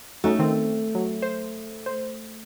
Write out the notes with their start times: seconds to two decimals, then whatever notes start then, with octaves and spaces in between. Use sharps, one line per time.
0.24 A3 C#4 D#4 F#4
0.39 D#3 C4
0.95 F#3
1.22 C5
1.86 C5